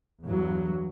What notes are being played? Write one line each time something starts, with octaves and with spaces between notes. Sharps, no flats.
E2 G2 F#3